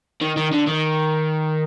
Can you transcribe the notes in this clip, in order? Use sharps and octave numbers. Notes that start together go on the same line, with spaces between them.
D#3
D#3
D3
D#3